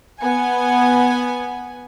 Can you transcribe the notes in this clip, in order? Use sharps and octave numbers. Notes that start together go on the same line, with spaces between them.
B3 G#5